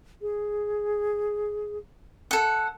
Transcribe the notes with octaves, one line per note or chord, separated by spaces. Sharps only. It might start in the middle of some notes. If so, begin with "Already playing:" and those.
G#4
A4 F#5